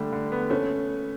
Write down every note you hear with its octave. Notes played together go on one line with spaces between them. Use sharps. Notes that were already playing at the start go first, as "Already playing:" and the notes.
Already playing: D3 G3 A3
D3
B3
A3 C#4